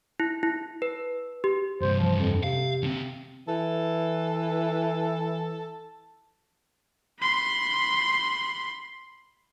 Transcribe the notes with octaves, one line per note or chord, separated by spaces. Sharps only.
E4
E4
B4
G4
G2 C3 C5
F3
F2
C3 F5
D3 C4
E3 A4
B5 C6